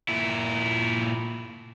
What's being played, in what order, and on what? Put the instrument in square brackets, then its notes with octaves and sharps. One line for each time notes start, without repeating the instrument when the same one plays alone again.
[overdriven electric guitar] A#2 E4